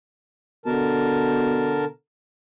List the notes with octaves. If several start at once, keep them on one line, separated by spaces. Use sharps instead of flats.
B2 D3 A#4 A5